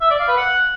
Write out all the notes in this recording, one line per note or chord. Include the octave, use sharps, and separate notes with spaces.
E5
D5
F5
B4
F#5